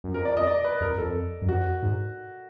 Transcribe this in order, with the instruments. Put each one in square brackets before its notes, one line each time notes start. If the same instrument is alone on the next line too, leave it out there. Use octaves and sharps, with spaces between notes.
[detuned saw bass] F#2
[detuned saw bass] F2 [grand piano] A#4
[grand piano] D5
D#5
D5
B4
[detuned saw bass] F2 [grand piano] A#4
[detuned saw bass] F2 [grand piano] A4
[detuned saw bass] F#2
[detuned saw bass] F2 [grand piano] F#4
[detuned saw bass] G#2